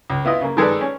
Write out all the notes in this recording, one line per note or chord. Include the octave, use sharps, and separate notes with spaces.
C#2
B3 E4 F4 D#5
C#3 A#3
D#3 G#3 A4 B4 D5
C#4